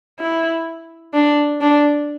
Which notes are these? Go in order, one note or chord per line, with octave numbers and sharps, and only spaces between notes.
E4
D4
D4